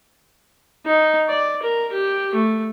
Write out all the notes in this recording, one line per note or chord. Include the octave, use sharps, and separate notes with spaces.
D#4
D5
A#4
G4
A3